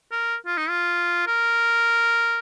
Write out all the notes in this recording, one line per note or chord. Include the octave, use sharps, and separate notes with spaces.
A#4
F4
D#4
F4
A#4